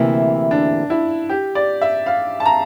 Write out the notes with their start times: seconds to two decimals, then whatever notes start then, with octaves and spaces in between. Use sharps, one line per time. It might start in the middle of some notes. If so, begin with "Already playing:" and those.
Already playing: D2 C3 E3 A#3 E4
0.51 D4
0.90 E4
1.29 G4
1.55 D5
1.81 E5
2.06 F5
2.40 A5
2.46 A#5